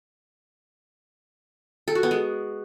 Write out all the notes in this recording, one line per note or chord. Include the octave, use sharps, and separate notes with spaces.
A4
F#4
B3
G#3